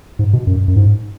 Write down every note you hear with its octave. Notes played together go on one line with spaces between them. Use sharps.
G#2
B2
F#2
F#2
G#2